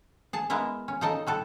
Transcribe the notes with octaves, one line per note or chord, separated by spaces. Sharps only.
G#4 A5
G#3 B3 E4 A#4 E5
C#4
C#3 D#4 A4 D#5 A5
G3 F#4 A4